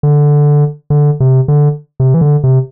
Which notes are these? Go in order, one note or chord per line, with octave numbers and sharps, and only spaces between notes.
D3
D3
C3
D3
C3
E3
D3
C3